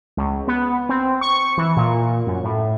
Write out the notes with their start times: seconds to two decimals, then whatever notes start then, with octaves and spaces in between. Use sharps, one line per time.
0.17 C#2
0.48 B3
0.89 C4
1.21 C#6
1.58 E3
1.77 A#2
2.27 F#2
2.44 A2